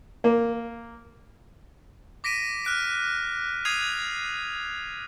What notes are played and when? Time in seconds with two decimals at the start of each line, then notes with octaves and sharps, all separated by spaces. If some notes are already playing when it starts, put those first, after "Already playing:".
0.24 A#3
2.24 D6 A#6 B6 D7 D#7
2.65 F6 F#6 D7
3.65 D#6 G#6 C7 D#7 F7